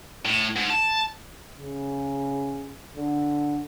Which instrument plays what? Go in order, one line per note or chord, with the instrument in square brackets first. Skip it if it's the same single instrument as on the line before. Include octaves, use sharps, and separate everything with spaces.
[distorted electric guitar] A2
G#2
A5
[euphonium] C#3
D3